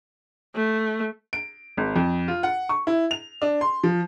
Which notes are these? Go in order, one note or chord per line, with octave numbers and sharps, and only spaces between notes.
A3
D7
G#1
F2
F4
F#5
C#6
E4
F7
D4
C6
F3